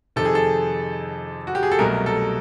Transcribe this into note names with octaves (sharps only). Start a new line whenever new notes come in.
F2 C3 D#3 A4
G#4
A4
F#4
G4
G#4
A4
C2 B2 F#3 A3 A#4
A4